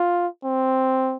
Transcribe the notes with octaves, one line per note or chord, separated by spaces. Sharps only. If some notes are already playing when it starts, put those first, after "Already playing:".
Already playing: F4
C4